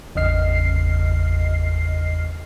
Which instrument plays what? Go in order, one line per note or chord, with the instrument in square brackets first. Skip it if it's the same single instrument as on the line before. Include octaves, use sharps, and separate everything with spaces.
[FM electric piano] G#1 E2 C#3 D#5 F6 C7